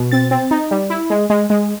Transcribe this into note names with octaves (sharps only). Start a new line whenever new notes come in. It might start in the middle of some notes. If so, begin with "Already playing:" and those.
Already playing: B2
C4 A6
C4
D#4
G3
E4
G#3
G#3
G#3